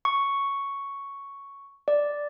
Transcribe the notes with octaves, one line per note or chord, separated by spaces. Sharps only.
C#6
D5